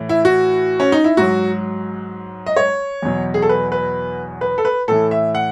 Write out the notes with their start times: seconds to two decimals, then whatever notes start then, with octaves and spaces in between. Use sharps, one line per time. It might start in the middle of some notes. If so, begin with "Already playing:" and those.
Already playing: A2 E3
0.09 E4
0.25 F#4
0.80 C#4
0.92 D#4
1.04 E4
1.17 G#2 F#3 F#4
2.46 D#5
2.56 C#5
3.02 E2 B2 F#3
3.34 G#4
3.42 A4
3.49 B4
3.72 B4
4.41 B4
4.58 A4
4.65 B4
4.88 A2 E3 A4
5.11 E5
5.35 F#5